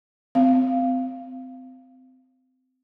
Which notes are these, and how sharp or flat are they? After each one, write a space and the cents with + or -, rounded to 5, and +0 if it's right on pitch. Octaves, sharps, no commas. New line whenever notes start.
C4 -30 F5 -10